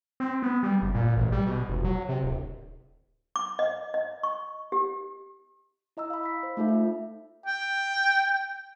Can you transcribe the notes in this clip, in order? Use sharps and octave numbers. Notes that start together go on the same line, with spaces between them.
C4
B3
G3
F#1
A#2
A1
G3
B2
F1
F#3
C3
D1
D6
D#5
D#5
C#6
G4
E4 D#5 A#5 E6
F5 B5
B5 B6
C5
A3 D#4 F4 A4 E5
E5
G5